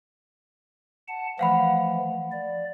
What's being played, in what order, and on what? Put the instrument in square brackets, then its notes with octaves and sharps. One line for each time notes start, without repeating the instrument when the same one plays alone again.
[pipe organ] F#5 A5
[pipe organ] E3 F3 A3 [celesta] F5 F#5 B5
[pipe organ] D5